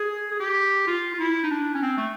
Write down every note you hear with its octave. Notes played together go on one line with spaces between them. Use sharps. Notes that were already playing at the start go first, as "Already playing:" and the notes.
Already playing: G#4
G#4
G4
F4
F4
E4
D#4
D4
C#4
C4
A3